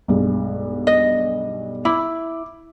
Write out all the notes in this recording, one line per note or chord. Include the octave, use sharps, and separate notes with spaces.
B1 G2 G#3
D#5
E4 D6